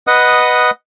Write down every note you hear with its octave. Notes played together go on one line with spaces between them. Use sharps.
B4 D#5 F#5 D#6